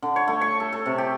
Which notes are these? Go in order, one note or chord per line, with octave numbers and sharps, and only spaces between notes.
D3
C#5
A3
C#6
A4
A4
C3
G4